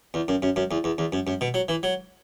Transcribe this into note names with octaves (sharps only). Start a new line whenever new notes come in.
E2
F#2
F#2
F#2
E2
E2
E2
F#2
F#2
B2
F#3
E3
F#3